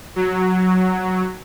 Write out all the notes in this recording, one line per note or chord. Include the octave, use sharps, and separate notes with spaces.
F#3